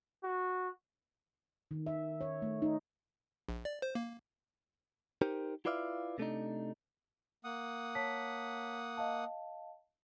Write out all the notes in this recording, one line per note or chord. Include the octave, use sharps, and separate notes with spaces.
F#4
D#3
E5
C#5
A3
D#4
A#1
D5
C5
A#3
D#4 G4 A#4 C5
E4 F4 B4 D5 E5 F5
C3 A3 D4 D#4
A#3 F#5 D#6
C#5 A5 B6
D#5 F5 A5